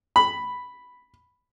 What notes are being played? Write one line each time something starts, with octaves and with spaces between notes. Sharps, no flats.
B5